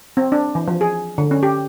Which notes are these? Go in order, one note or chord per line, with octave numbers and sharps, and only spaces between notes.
C4
D4
E3
F3
G#4
D3
C#4
G4